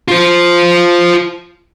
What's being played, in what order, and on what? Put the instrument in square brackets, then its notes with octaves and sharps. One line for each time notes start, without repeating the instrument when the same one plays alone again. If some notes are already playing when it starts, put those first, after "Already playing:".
[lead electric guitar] F4 C5